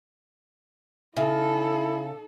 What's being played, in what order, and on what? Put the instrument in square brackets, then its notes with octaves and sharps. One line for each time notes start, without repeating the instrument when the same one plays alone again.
[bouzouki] C#3 [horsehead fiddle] D#4 A4 [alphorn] E4 [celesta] E5